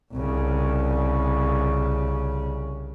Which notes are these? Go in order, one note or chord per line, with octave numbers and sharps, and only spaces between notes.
C2 C#3